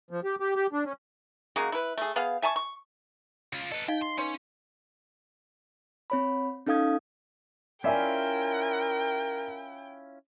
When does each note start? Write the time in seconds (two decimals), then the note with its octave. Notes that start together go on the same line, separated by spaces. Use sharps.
0.11 F3
0.24 G4
0.40 G4
0.56 G4
0.73 D4
0.85 C#4
1.56 C#3 G#3 A#3 F#4
1.72 E4 B4
1.98 A3 G#4
2.16 B3 G#4 F5
2.42 E5 G#5 A5 C#6
2.56 C#6
3.53 C#3 F4
3.72 A4 B4 D#5
3.88 D#4 D#5 F5 G5
4.02 C6
4.18 C#4 B4 C#5 C6
6.10 C4 C#5 B5
6.67 C#4 D#4 A4 F5 D#6 G#6
7.84 C#4 E4 F4 A#4 D5 E5 G5 G#5